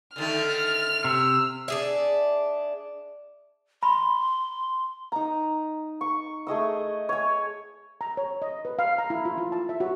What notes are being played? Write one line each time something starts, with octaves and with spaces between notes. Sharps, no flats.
D3 D#3 A3 F6
C3 E6
D4 G#4 E5
B5 C6
D#4 A#5
C#6
A3 G#4 D#5 E6
C#5 G#5
A#5
C#5
D#5
B4
F5
A#5
E4
F4
F4
A5
E5
F#4